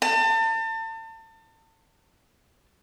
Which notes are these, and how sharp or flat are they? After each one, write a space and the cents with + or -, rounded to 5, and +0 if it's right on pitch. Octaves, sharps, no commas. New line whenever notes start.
A5 +35